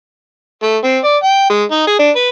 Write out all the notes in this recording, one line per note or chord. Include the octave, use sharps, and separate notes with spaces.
A3
C4
D5
G5
G#3
D#4
G#4
D4
B4